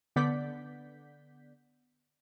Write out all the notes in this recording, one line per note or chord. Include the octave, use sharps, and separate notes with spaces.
D3 B3 D5 F#5 G6 B6